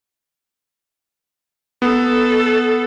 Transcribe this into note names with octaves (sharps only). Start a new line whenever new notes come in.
B3 A4